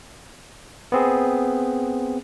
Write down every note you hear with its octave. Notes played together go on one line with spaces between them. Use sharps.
B3 C4 G#4